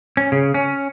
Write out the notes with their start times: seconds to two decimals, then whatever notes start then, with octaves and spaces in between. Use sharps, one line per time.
0.17 C#4
0.32 C#3
0.54 C#4